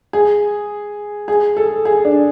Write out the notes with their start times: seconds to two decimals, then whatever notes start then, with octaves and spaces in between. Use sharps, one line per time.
0.13 G#4
1.28 G#4
1.57 A4
1.85 G#4
2.05 D4